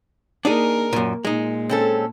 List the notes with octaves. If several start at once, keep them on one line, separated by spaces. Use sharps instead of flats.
A#3 D4 D#4 G#4 A#4
F#2 A#2
A#2 G#3 D#4
C4 C#4 A4